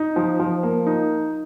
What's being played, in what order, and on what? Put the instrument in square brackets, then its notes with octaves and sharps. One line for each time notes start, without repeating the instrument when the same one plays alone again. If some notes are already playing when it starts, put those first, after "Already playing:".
Already playing: [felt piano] D#4
F3
F3
A#3
D#4